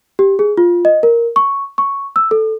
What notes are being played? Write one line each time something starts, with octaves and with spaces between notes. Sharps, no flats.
G4
G#4
F4
D#5
A#4
C#6
C#6
E6
A4